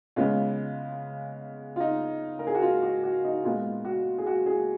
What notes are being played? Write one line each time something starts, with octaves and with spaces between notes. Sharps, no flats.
C#3 G#3 B3 F4
F4
D#4
A#4
G#4
F#4
F4
F#4
F#4
D#4
A#2 G#3 B3 F4
F#4
G#4
F#4
G#4